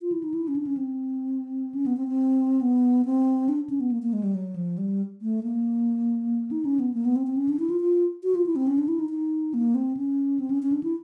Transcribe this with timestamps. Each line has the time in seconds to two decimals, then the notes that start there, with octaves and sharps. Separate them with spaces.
0.02 F4
0.12 E4
0.23 D#4
0.34 E4
0.48 C#4
0.56 D4
0.67 C#4
0.77 C4
1.75 C#4
1.86 B3
1.97 C4
2.08 C4
2.61 B3
3.05 C4
3.49 D4
3.69 C#4
3.80 B3
3.91 A#3
4.02 A#3
4.13 G#3
4.23 G3
4.35 F#3
4.56 F3
4.78 G3
5.22 A3
5.43 A#3
6.51 D#4
6.65 C#4
6.79 B3
6.94 A#3
7.05 B3
7.16 C4
7.27 C4
7.37 C#4
7.49 D4
7.59 E4
7.70 F4
7.81 F4
8.23 F#4
8.35 F4
8.46 E4
8.56 C4
8.67 C#4
8.78 D4
8.88 E4
8.99 D#4
9.10 D#4
9.54 A#3
9.75 C4
9.97 C#4
10.40 C4
10.50 C#4
10.62 C#4
10.72 D4
10.83 E4